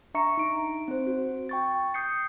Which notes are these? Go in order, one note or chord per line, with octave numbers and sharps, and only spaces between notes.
D4 E5 A#5 C#6 C#7
D#4 D7
C4 C5
F#4
G5 C#6 A6
D#6 G6 C7 C#7